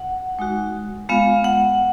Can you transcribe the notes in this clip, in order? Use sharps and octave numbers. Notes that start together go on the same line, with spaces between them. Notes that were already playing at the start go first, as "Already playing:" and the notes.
Already playing: F#5
G#3 D#4 F#4
G#3 B3 F4 F5
F#5